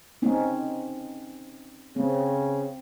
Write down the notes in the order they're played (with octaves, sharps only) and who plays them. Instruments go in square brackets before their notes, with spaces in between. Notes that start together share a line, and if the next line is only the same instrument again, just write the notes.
[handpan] C4 C#4 D#4
[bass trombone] C#3 [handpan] C4